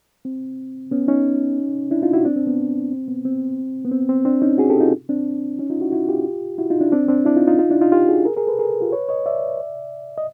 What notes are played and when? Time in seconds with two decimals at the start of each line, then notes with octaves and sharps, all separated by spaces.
0.25 C4
0.91 B3 C#4
1.08 C#4 D#4
1.91 D4 E4
2.03 D#4 F4
2.13 E4 F#4
2.25 C4 D4
2.36 C4
2.47 B3
2.92 C4
3.08 B3
3.25 C4
3.85 B3
3.91 C4
4.09 C4
4.25 C4 D4
4.42 C#4 D#4
4.58 F#4 G#4
4.70 G4 A4
4.80 D#4 F4
5.09 C4 D4
5.59 C#4 D#4
5.70 D#4 F4
5.81 E4 F#4
5.92 E4 F#4
6.04 F#4
6.09 F4 G4
6.58 E4 F#4
6.70 D#4 F4
6.81 D4 E4
6.92 C4 D4
7.08 C4 D4
7.25 D4 E4
7.36 D#4 F4
7.48 D#4 F4
7.59 D#4 F4
7.70 D4 E4
7.81 D#4 F4
7.92 F4 G4
8.09 F#4 G#4
8.25 G#4 A#4
8.36 G#4 A#4
8.47 A4 B4
8.59 G#4 A#4
8.81 F4 G4
8.92 B4 C#5
9.09 C#5 D#5
9.26 D5 E5
10.18 D#5